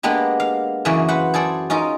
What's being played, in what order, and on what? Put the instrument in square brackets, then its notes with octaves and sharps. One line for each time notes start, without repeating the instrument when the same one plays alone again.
[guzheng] G#3 A#3 B3 D4 G4
F5
F#2 C#3 E3 A#3 C#4 D5
B4 C5 F#5
G#4 A4 C5 D5
C#4 D#4 F4 A#4